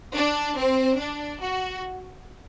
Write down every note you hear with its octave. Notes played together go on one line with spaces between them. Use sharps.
D4
C4
D4
F#4